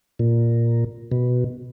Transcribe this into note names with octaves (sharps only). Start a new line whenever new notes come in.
A#2
B2